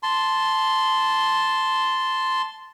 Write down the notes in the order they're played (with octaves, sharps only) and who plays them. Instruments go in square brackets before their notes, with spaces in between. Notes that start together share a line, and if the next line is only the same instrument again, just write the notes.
[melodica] A5 C6